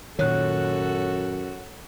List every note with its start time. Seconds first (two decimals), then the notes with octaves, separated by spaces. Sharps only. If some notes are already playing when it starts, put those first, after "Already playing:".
0.19 F#2 A#2 D#3 F#4 A4 C#5 F#6